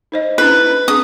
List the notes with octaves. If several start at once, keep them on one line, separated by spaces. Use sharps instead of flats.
D#4 C5 D#5
C#4 D4 E4 B4
C4 D4 G#4 D#6